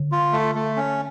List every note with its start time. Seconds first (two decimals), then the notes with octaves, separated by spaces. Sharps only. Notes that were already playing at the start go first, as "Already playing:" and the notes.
Already playing: D3
0.12 F4
0.33 A3
0.55 A3
0.77 C#4